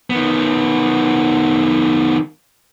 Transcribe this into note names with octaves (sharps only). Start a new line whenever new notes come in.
D#3 B3